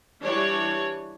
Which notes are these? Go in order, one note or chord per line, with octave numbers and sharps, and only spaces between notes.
E3 G3 D4 C#5